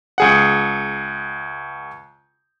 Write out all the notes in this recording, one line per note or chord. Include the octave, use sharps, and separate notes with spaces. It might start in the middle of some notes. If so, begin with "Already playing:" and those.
C#2 G#4 F#5